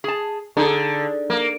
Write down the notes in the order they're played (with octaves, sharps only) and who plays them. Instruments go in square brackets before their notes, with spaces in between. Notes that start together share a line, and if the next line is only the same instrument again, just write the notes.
[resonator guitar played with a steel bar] G#4 A5
[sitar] D3 [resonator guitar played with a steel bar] D#4 G#4
[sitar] A#3